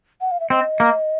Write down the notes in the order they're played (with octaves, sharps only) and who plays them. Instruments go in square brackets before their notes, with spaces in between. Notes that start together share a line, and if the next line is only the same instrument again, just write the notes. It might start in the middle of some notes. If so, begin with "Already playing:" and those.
[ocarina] F#5
F5
E5
[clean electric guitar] C4 [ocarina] D#5
[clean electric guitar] A#3